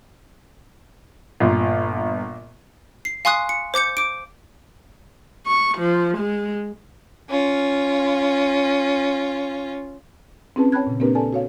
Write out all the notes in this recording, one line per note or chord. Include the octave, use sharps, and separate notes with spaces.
G1 A#2
C7
F5 G#5 C6 C#6 D#6 F#6
C#7
C5 D6 G6 C#7
D6 D7
C#6
F3
G#3
C#4 F4
C4 C#4 E4 G#4 B4 A5
C#5 G5 A5 B5 F#6 G#6
A#2 C#3
A#3 C4 D4 G4 A#4 B4
A4 D5 G#5 A5
F#4 C#5 F5